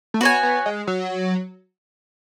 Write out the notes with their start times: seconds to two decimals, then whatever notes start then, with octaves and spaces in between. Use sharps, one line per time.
0.14 A3
0.21 B3 F#4 C#5 G#5
0.43 B3
0.66 G#3
0.87 F#3